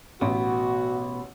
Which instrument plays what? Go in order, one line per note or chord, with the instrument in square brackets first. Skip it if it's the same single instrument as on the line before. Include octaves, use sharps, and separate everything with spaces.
[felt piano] A1 [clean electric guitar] B2 B3 [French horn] F#4